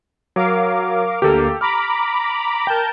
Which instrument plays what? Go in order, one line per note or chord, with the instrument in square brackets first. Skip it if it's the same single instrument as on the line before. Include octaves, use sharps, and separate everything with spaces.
[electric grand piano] F#3 [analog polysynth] A#4 F5 D6
[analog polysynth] D2 A#3 [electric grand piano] G4 A4
[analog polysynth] A#5 B5 D6 [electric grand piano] F6
[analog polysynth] A#4 A5 G6 [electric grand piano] G5